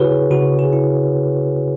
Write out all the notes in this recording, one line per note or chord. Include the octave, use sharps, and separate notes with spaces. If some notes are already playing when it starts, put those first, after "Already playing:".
Already playing: C#3 E4 F#4 G#4 B4 C#5
C#3 F#4
G#4
E4